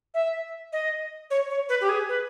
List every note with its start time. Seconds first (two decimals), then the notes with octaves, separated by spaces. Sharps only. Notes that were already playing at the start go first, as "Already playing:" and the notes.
0.14 E5
0.73 D#5
1.30 C#5
1.50 C#5
1.69 B4
1.81 G4
1.89 G#4
2.09 B4